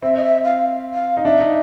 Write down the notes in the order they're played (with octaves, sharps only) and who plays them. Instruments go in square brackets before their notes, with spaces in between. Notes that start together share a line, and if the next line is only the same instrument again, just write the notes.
[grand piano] C4 [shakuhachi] E5
[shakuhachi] D#5
E5
F5
F5
[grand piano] D#4
[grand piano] D4 [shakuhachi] E5
[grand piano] D#4